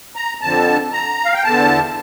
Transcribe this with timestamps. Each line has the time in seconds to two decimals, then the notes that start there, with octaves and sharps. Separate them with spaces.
0.16 A#5
0.41 F2 D3 A5
0.92 A#5
1.25 F5
1.34 G5
1.44 E2 D3 A5